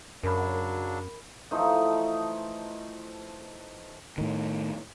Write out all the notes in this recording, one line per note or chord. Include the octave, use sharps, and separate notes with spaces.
F#2 C#3 F#3 D4 A#4 B5
E3 F3 A3 D#4
A2 D#3